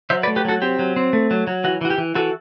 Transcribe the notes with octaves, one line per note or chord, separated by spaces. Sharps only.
F#3 C5 E5
B4 D5
A3
G4 B4
F#3 F#4 A4
C4 G4
F#3
C4
A3
F#3
F#3
E3 F#4
E3 F#4
G4
E3
E3 F#4 A4